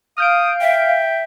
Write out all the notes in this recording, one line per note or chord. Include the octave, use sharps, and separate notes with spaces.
F5 D#6 F6 G6 D7
E5 G5